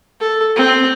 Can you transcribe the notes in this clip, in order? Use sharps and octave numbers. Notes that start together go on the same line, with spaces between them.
A4
C4